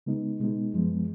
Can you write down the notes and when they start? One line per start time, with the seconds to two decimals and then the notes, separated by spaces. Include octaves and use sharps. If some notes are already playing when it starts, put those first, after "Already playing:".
0.06 C#3 G#3 B3 D#4
0.39 B2 G#3 B3 D#4
0.73 F#2 F3 G#3 B3